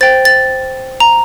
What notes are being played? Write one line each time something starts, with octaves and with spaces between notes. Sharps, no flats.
C5 G5 A6
A6
A#5